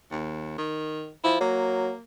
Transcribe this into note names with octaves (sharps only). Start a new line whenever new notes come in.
D#2
D#3
F3 E4
F#3 A#3